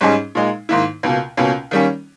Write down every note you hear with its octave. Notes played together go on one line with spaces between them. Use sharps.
G#2 G3 C#4 G#4 D#5
A#2 G#3 D#4
G#2 D#3 A#3 E4
C#2 B2 A#3
C#2 B2 A#3 C#4
D#3 G3 A#3 C#4